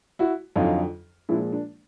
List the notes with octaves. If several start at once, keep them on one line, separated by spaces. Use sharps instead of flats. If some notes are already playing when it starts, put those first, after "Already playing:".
E4 F#4
F2 D3 F#3 D#4 F4
A#2 F3 G#3 D4 E4
D4